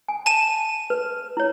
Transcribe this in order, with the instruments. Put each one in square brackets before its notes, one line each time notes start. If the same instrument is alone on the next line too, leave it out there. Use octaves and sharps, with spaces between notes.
[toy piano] G#5
[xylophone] A5 D#7 E7
[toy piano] B4
E4 C#5